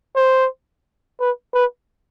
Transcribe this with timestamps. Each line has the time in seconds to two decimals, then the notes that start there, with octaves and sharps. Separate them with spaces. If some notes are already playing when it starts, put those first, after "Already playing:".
0.16 C5
1.20 B4
1.54 B4